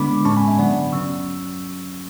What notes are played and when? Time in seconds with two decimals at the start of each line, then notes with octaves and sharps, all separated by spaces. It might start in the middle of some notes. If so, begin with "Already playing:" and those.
Already playing: D3 G#3 B3 D4 B5 D6
0.25 A2 G#3 C#4 A5 C#6
0.37 G#5 B5
0.48 E5 G#5
0.59 D3 F#3 B3 D4 D5 F#5
0.92 C#3 F#3 C#4 C#6 E6